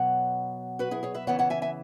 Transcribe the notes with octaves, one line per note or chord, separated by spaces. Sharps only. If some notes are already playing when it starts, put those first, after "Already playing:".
Already playing: B2 F#3 B3 C#5 F#5
F#4 B4
E4 G#4
G#4 C#5
B4 E5
C#3 E3 B3 C#5 F#5
C#5 F#5
E5 G#5
E5 G#5